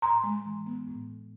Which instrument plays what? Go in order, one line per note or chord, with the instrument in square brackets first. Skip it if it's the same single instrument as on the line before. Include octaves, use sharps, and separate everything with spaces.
[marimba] A2 A#5 C6
G#3
E3
B3
A2